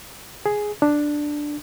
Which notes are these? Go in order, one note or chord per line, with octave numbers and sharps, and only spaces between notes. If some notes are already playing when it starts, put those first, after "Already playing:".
G#4
D4